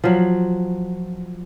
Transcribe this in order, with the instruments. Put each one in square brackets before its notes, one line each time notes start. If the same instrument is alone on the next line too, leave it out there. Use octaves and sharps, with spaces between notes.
[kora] F3 F#3